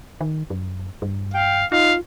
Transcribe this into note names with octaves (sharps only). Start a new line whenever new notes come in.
D#3
F#2
G2
F5 G5
D#4 F4 F5